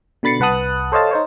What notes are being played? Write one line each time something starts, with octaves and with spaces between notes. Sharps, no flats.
B2 D3 B5 A6 C7 C#7
C2 B4 F#5 A5 D#6 F#6
A4 C5 C#5 D#5 F5 A5
D#4 C5 C#5